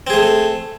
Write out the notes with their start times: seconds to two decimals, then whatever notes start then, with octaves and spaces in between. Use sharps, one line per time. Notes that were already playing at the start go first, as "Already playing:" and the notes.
0.07 C4
0.10 G#4
0.13 A3